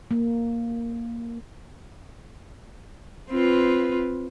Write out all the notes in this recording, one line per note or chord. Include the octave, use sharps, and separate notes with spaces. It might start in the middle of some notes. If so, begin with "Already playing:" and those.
A#3
C4 F4 B4